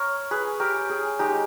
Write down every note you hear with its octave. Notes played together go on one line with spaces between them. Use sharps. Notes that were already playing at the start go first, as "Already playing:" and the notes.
Already playing: A#4 C#5
G#4 B4
G4 A#4
G#4
G#3 D#4 G4